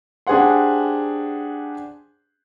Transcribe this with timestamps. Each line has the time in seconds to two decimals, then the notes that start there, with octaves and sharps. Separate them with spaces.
0.27 D4 G4 G#4 C5 F#5 C6